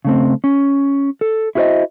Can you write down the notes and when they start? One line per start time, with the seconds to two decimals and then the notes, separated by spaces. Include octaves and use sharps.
0.05 C#3 A3 C4
0.44 C#4
1.21 A4
1.55 E4 F#4 G#4 B4 C5 D#5